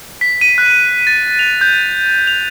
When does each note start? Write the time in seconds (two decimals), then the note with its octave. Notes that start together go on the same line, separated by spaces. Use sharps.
0.21 B6
0.41 D#7
0.58 F#6
1.07 A6
1.39 F7
1.61 G6
2.27 F7